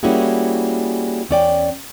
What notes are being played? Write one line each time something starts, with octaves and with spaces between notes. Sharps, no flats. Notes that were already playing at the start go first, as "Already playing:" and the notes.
G3 A#3 C#4 E4 F#4 G#4
E2 C#4 D5 G5